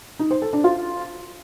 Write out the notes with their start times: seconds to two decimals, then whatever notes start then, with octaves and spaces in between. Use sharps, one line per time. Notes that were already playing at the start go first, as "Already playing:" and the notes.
0.19 D#4
0.31 C5
0.42 A4
0.53 D4
0.64 F4